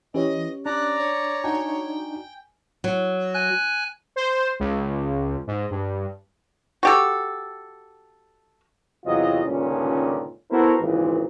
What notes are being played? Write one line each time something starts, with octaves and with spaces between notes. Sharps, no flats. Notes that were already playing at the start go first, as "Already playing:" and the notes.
E3 C#4 G4 C#5 D#5
D4 D5 A#5 F#6
C#5
D4 D#4 F#4 G5 G#5
F#3
G#5 F#6
C5
C#2
G#2
G2
F#4 G4 A4
E2 C3 F#3 F4 D#5
C#2 G2 A#2 D3 D#3 C#4
B3 E4 F#4 A4 A#4 C5
G#1 C#2 A#2 E3